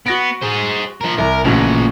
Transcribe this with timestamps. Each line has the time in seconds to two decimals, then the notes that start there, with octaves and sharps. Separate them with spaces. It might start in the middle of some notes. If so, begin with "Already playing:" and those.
0.06 B3 F#4 A#6 D7
0.42 G#4 C5
1.01 F3 A#4
1.18 C2 A#4
1.45 A1 A#2 C#3 F3 F#4